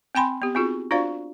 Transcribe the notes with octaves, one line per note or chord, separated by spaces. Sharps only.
C4 G5 G#5 B5 C6
B3 G4
C4 D#4 F4 F#4 G#4
D4 F4 F#4 C5 D5 F5